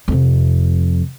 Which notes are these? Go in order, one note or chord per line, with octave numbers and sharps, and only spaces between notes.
F2 C3